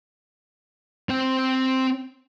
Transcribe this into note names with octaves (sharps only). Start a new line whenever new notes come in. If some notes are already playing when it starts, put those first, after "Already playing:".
C4 G5